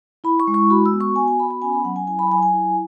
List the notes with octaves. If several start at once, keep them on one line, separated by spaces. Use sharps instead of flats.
E4 B5
C#6
G#3
C#6
F#4 B5
E6
B3
C#6
F#4 G#5
G#5
B3 B5
B5
C#4 G#5
B5
F#3 F#5
G#5
E4 G#5
B5
F#3 G#5
G#5
E4